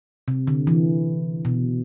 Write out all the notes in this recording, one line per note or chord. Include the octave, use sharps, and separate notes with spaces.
C3
D3
E3
B2